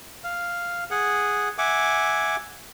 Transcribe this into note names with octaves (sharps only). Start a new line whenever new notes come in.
F5
G#4 F#5
E5 F#5 G#5 D6